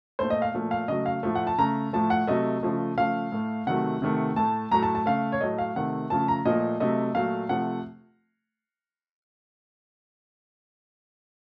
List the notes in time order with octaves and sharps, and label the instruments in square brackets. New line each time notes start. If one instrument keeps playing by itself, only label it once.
[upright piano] A#2 A3 C5
D#5
F5
A#2 F3 A3
F5
C#3 F#3 A3 D#5
F5
A2 F3 A3
F#5
A5
C#3 A3 A#5
A2 F3 A3 A5
F#5
C3 F#3 A3 D#5
C#3 F3 A3
C#3 F3 A3 F5
A2 A3
C3 D#3 F#3 A3 F#5
C3 D#3 A3
A2 A3 A5
A2 F#3 A3 A#5
A5
A5
C#3 A3 F5
C#5
A2 F#3 A3 D#5
F5
C3 D#3 A3 F#5
C#3 F3 A3 A5
A#5
A#2 F3 A3 D#5
C3 F#3 A3 D#5
A#2 F#3 A3 F5
C3 F3 A3 F#5